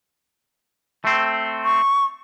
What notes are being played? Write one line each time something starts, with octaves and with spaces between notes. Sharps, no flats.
A3 C4
C#6